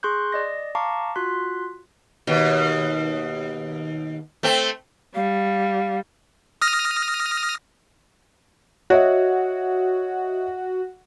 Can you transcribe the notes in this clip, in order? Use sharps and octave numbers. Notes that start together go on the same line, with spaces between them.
G#4 C6 C#6 F#6 G6
D5 D#5 A#6
F5 A5 A#5 C#6 D6
F4 F#4 C6 F#6 B6
D#2 B2
A3 C4
G3 F5
D#6 F6 A#6
F#4 C#5 D#5 E5